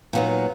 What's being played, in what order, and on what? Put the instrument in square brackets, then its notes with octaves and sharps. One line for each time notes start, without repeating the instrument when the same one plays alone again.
[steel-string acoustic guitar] A#2 F#3 B3 D#4